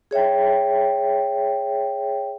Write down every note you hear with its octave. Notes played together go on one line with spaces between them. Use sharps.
G#4 C#5 E5 G5